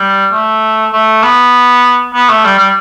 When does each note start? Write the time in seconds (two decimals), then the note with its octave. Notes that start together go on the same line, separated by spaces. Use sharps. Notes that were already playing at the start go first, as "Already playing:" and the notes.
Already playing: G3
0.32 A3
0.92 A3
1.23 B3
2.13 B3
2.29 A3
2.44 G3
2.59 G3